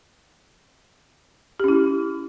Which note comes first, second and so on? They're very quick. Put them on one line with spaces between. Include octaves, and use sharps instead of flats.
G4 C#4 E4